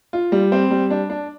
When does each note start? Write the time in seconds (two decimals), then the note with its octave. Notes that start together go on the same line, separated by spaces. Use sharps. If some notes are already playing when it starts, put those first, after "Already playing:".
0.13 F4
0.32 G3
0.52 C4
0.71 G3
0.90 D4
1.10 D4